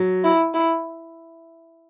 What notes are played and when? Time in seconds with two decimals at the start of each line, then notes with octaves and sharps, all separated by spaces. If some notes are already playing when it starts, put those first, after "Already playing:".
Already playing: F#3
0.24 E4
0.54 E4